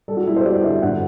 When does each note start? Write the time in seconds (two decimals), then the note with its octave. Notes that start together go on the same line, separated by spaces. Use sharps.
0.08 G3 A4
0.17 F#4
0.27 G3 E4
0.36 C5
0.45 G3 D5
0.64 D3 E5
0.82 G2 F#5